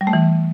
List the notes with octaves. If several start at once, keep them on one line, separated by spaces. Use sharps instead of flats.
G3
A3
E3